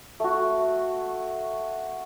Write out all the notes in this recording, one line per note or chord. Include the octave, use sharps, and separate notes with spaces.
A3 F#4